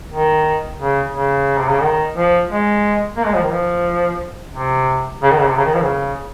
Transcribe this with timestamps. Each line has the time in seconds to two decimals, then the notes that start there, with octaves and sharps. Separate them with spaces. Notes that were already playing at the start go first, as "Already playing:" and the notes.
0.10 D#3
0.78 C#3
1.12 C#3
1.58 C3
1.69 C#3
1.81 D#3
2.15 F3
2.49 G#3
3.17 A#3
3.26 G#3
3.35 F3
3.43 D#3
3.52 F3
4.54 C3
5.23 C#3
5.31 D#3
5.40 C#3
5.48 C3
5.57 C#3
5.65 D#3
5.74 F3
5.83 C#3